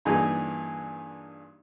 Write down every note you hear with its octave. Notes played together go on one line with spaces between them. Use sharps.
G2 A#2 E3 D#4 G#4 G#5